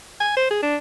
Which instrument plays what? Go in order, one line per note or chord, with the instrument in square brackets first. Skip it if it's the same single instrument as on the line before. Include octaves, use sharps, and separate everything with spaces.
[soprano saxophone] G#5
C5
G#4
D4